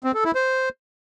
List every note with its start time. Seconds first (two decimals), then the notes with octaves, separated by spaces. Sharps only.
0.04 C4
0.14 A4
0.25 E4
0.35 C5